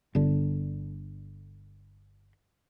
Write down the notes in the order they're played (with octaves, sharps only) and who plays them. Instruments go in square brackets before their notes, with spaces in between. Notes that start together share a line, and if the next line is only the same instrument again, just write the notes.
[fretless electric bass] G1 D3